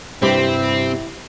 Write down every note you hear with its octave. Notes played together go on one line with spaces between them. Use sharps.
G2 C3 C4 E4 G4 B5